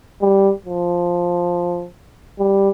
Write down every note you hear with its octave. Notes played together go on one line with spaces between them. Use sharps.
G3
F3
G3